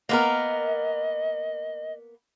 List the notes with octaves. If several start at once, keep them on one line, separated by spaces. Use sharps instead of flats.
A#3 B3 A#4 D#5